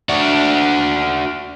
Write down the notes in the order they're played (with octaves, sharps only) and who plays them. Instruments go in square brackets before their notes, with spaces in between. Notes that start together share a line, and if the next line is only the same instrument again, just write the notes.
[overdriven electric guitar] D4 F#4